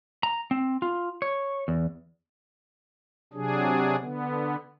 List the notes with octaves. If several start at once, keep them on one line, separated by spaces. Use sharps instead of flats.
A#5
C4
F4
C#5
E2
C3 F#3 D4 G#4
D3 B3